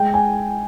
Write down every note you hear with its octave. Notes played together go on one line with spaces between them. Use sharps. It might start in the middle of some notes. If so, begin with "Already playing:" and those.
Already playing: G#3 G5
G#5